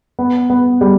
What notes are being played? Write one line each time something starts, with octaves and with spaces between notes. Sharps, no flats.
B3
B3
G3